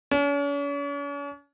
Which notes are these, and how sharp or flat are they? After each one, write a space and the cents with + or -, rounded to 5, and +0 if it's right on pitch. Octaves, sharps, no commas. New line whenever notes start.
C#4 +45